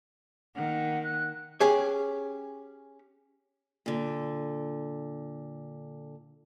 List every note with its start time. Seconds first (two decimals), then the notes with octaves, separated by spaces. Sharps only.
0.55 D#3 A#3 F#5
1.03 F#6
1.60 C#4 G4 G#4 C#5
3.86 A#2 D3